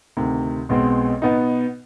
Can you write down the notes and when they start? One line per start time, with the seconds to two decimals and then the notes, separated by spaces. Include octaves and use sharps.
0.17 D2 C3 D#3
0.69 B1 B2 G#3 C4
1.22 B2 B3 D#4